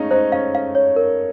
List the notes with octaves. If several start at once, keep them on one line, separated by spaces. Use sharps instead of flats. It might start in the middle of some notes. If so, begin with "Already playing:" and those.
Already playing: G#3 A3 C#4 D#4 F5
D#4 C5
C#4 F5
F5
C#5
A#4